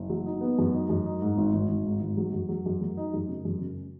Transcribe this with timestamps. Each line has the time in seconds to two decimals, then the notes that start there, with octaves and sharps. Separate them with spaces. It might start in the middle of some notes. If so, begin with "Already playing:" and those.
Already playing: F#1
0.09 F#3
0.26 D#4
0.41 B3
0.58 F#2
0.74 D#4
0.89 F#2
1.06 D#4
1.22 G#2
1.37 G#1
1.53 G#1
1.69 G#1
1.85 G#2
2.01 G#1
2.17 F#3
2.33 F#2
2.49 F#3
2.66 F#2
2.81 F#3
2.97 D#4
3.13 F#2
3.29 C#3
3.45 F#2
3.60 C#3